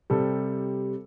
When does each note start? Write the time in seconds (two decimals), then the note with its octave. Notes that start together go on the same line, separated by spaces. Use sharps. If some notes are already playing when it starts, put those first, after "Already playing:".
0.10 C3 G3 A4